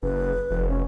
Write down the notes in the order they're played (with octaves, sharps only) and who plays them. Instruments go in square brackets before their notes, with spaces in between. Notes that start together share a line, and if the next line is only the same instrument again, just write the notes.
[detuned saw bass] F#1 [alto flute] B4
[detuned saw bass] F1
[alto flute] C#4